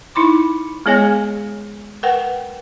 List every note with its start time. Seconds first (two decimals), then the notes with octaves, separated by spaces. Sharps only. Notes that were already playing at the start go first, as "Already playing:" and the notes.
0.15 D#4 E4 B5 C6 D6
0.86 G#3 B3 G#4 C#5 D#5 G#5
2.03 A#4 B4 F#5 G5